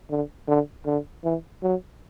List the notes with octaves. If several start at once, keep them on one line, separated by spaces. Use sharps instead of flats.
D3
D3
D3
E3
F#3